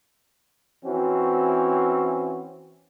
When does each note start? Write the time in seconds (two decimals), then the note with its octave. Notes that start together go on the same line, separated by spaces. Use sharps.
0.83 E3 C4 C#4 F#4